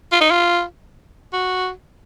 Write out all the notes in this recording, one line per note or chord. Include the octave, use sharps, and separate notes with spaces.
F4
D#4
F4
F#4